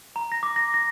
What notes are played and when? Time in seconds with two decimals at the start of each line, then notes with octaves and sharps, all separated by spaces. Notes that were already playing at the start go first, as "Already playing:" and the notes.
0.16 A#5
0.32 A#6
0.43 D6
0.56 A#6
0.74 A#6